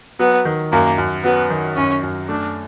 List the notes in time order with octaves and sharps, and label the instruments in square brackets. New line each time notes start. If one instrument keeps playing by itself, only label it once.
[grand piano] F#3 [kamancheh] B3
[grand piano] D#3
[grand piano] F#2 [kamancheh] A#3
[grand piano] F#2
[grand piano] F#3 [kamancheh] B3
[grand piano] D#3
[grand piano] F#2 [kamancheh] C#4
[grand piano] F#2
[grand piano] A3 [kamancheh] D4